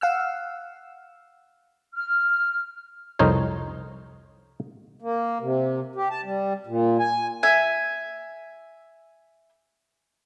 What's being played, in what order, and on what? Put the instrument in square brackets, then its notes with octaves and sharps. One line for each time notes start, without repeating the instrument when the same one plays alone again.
[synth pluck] F5 F#5 E6
[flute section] F6
[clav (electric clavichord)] C2 F2 D#4 A#4 C5 C#5
[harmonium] A#3
C3
G4
A5
G3
A#2
G#5
[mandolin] E5 G#5